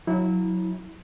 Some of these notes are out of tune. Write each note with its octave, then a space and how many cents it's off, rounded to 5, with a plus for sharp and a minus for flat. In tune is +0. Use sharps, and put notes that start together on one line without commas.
F#3 -15 E4 -25